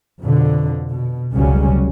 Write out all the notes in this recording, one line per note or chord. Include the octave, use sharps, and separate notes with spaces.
F2 B2 D3
B2
F1 C#2 C#3 F#3 G3 C#4